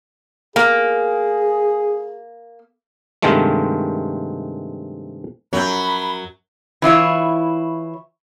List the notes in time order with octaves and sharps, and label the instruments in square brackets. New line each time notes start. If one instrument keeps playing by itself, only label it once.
[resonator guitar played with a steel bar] A#3 [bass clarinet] G#4
[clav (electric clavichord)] G2 C3 D#3 F3 G#3 A3
[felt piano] F#2 F3 G6 [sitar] F#3 [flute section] B5
[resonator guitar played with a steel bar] E3 E4 F4 C#5